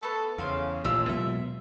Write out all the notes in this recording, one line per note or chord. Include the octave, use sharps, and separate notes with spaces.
A3 B3 A4
E2 C#3 C5 F5
A1 D#2 A#2 F4 G4 E5 E6
B2 F#3 G#3 E5